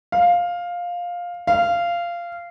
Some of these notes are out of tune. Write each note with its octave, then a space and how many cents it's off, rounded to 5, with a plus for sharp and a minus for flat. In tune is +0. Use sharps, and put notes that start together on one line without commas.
F5 +10
F5 -15